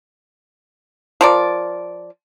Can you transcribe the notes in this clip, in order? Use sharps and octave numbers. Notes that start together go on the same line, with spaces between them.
F3 A#4 D5